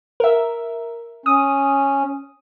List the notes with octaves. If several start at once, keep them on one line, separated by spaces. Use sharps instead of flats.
A#4 E5
C#4 D#6